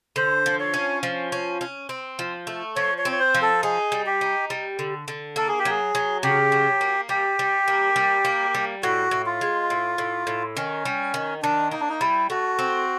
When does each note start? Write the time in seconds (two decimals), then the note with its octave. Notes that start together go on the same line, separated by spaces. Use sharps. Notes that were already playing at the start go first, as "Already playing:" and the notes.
0.16 D3 C5
0.46 F3
0.60 C#5
0.74 C#4
1.03 F3
1.32 C#4
1.61 C#4
1.89 C4
2.19 F3
2.47 A3
2.76 F3 C#5
2.98 C#5
3.05 C4
3.12 C#5
3.19 C5
3.35 F3
3.42 A4
3.63 D#4 G#4
3.92 G3
4.06 G4
4.21 D#4
4.50 G3
4.79 D3
5.08 D3
5.36 A#3 A4
5.48 G#4
5.59 G4
5.65 F#3 G#4
5.95 F#3
6.23 C#3 G4
6.52 F#3
6.81 A#3
7.09 G3 G4
7.39 G3
7.68 A#3
7.96 G3
8.25 A#3
8.55 G3
8.83 A2 F#4
9.11 A2
9.26 F4
9.41 G#3
9.70 A2
9.98 A2
10.27 A2
10.56 D#3 C#4
10.85 G3
11.14 D#3
11.42 D#3 D4
11.71 A#3 D#4
11.80 D4
11.89 D#4
12.01 G3 E4
12.30 A3 F#4
12.59 C4